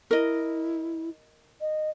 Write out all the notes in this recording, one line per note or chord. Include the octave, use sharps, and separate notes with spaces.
E4 A#4 D#5
D#5